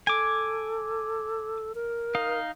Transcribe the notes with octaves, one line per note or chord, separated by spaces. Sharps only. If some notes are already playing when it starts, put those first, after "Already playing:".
A4 G#5 D6
A#4
D#4 F5